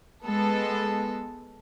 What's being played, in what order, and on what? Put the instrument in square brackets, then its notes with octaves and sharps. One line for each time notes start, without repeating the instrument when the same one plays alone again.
[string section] G#3 B3 A4